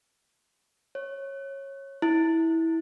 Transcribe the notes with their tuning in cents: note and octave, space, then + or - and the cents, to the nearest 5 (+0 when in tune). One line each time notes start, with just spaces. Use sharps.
C#5 -20
E4 -15